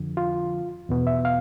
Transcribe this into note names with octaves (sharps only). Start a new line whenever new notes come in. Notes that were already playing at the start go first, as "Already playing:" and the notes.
Already playing: F2 D3 F3
F4
E2 B2 B3
E5
F5